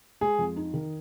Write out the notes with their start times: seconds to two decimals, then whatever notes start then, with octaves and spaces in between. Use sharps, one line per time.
0.21 G#3 G#4
0.39 F2
0.56 D#4
0.74 D#3